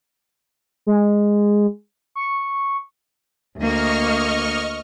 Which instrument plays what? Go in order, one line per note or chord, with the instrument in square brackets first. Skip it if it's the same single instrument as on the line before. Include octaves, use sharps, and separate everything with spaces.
[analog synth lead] G#3
C#6
[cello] D2 A#3 [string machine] D#5 C#6 F6